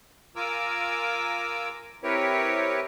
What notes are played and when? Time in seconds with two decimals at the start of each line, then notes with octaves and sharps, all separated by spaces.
0.36 F4 A#4 G#5 A#5 D6 E6
2.03 C4 E4 G4 A#4 B4 C#5